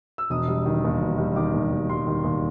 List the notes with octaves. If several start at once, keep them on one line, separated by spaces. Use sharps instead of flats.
E6
E1 D#6
G3
D#3
D#2
E1
G3
D#3 D6
D#2
E1
G3 C6
D#3
D#2